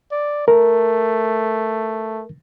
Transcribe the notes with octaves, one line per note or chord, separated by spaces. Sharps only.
D5
A3 A#4